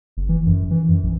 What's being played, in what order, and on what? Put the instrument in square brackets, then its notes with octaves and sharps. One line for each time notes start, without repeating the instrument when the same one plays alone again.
[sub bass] F#1
E3
F#2
E3
F#2
A#1